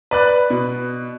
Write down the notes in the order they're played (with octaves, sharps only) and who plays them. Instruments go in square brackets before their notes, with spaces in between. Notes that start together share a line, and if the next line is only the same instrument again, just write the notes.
[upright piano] B4 D5 F#6
B2